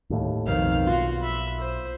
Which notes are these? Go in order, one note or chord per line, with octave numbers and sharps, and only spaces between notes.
D#2 A2
B1 F2 D#3 C4 F5
F4 F#4 C6
E5 B5
C5